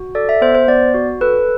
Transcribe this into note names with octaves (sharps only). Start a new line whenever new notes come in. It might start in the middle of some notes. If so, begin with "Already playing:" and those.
Already playing: F#4
A4 D5
E5
B3 C5
C5
B3 D5
F#4
A4 B4